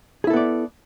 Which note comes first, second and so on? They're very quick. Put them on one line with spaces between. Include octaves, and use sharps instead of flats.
G#4 E4 A4 B3 D5